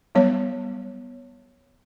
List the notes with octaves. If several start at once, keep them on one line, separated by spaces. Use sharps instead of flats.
F#3 G3 B3 C#5